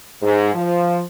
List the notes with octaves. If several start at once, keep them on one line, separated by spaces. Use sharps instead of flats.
G#2
F3